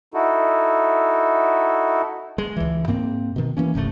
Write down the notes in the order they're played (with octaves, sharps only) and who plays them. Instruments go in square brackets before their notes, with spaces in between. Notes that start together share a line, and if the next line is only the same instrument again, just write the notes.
[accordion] D#4 E4 F#4 A4
[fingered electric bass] G#3
C#2 E3
G#2 A#3 C4
B2 D#3
E3 A#3 C#4
D1 G1 C3 A3